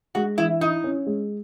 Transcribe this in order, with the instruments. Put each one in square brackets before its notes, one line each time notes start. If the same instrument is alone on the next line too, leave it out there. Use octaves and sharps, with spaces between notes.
[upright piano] G#3 [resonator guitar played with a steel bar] F#4
[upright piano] E3 [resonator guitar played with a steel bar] E4
[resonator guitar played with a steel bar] D#4 [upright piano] E4
[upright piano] C#4
G#3